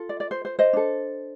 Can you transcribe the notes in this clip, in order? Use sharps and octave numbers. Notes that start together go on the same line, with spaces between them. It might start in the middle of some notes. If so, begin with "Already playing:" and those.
Already playing: F4 A4
D5
D5
C5
C5
C5 D#5
D4 A4